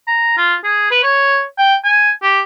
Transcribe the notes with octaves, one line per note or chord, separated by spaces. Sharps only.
A#5
F4
G#4
B4
C#5
G5
G#5
G4